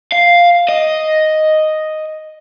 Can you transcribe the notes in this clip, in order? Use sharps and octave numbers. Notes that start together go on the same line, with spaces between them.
F5
D#5